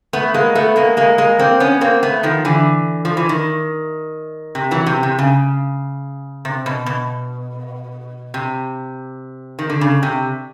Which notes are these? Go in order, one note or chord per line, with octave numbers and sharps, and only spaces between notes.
A3 B3
G#3 A#3
A3 B3
G#3 A#3
G#3 A#3
G#3 A#3
A#3 C4
B3 C#4
A#3 C4
A3 B3
D#3 F3
D3 E3
F3
E3
D#3
C3
E3 F#3
C3
C3
C#3
C3
B2
B2
C3
D#3
D3
C#3
C3